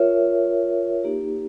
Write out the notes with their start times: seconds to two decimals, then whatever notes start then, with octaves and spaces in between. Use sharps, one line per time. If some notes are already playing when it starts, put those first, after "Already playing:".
Already playing: F4 A#4 C#5 E5
1.04 A#3 D#4 G4